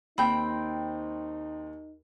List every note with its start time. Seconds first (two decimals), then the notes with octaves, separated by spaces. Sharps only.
0.18 D#2 C4 D#4 G5 B5